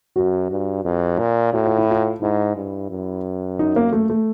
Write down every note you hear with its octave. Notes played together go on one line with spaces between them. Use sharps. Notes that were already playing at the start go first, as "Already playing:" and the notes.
F#2 F#4
G2
F2
A#2
A2 F#4
F4
E4
F4
G#2 E4
G2
F#2
D#4
A#3
A3
A3